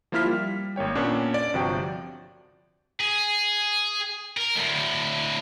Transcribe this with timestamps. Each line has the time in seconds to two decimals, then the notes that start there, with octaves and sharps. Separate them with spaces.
0.12 F3 A#3 E4 F4 F6 B6
0.25 G3
0.76 G#1 A#3 C#5 G5
0.95 A#2 B3 C#4 D4
1.34 D5
1.53 G1 C3 F3 F#4 D5 G5
3.00 G#4
4.37 A#4
4.56 D2 A2